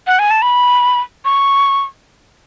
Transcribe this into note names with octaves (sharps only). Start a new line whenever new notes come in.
F#5
G#5
A5
B5
C#6